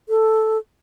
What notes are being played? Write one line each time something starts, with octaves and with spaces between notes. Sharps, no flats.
A4